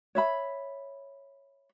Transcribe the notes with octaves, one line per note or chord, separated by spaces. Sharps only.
C#5 E5 B5